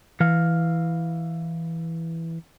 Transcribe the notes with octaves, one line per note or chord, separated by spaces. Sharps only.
E3 F5